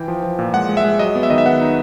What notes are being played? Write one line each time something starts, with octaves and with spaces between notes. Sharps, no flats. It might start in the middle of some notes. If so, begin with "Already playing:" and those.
Already playing: E3 G5
F3
F3
A#2
G#3 F#5
G#3
E5
G#3
F#3 D#5
B3
E5
D#3 D#5
E5
B3 F#5
D#4